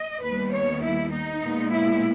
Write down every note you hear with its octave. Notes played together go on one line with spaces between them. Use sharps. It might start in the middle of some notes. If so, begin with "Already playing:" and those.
Already playing: D#5
D#2 D#3 G3 B3 B4
C#5
E4
D#4
A#2 G#3 B3
E4